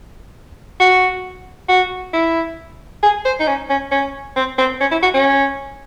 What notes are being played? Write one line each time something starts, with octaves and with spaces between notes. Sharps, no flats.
F#4
F#4
E4
G#4
C5
D#4
C#4
C#4
C#4
C4
C4
C#4
E4
F#4
C#4